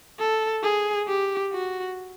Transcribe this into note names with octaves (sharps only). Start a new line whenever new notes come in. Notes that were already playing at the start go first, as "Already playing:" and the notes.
A4
G#4
G4
F#4